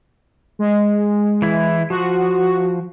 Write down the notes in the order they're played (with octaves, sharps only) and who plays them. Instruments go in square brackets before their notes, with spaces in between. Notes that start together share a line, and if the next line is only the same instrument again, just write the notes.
[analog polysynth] G#3
[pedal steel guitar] E3 E4
[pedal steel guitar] F3 [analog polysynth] F#4